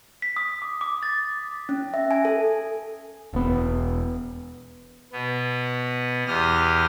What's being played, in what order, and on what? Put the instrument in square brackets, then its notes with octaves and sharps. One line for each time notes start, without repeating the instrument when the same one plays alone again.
[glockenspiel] B6
D#6
D6
D6
A6
[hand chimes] C#4
E5
G#5
A4
[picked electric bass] E1 B3
[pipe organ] B2 B3
E2 G4 D#6 F6